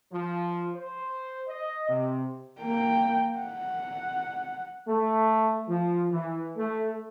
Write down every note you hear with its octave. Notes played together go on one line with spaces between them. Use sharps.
F3
C5
D#5
C3
A#3 G5
F#5
A3
F3
E3
A3